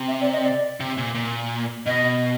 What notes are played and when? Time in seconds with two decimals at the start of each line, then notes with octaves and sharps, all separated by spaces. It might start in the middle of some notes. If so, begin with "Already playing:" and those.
Already playing: C3
0.08 E5
0.21 D5
0.33 D#5
0.44 D5
0.80 C3
0.98 A#2
1.15 A#2
1.86 B2 D#5